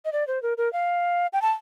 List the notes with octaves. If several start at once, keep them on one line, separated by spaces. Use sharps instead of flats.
D#5
D5
C5
A#4
A#4
F5
G5
A5